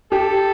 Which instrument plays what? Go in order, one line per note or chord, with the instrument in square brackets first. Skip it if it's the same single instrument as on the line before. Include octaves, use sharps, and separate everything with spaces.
[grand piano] G4 [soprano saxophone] A4